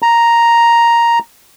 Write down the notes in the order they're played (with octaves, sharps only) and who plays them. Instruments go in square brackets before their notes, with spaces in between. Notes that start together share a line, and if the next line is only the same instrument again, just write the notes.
[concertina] A#5